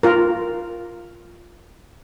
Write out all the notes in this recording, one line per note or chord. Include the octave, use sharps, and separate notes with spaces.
F4 A#4